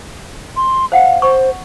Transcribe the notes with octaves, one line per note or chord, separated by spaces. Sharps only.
C6
C5 F5 F#5
C5 C#6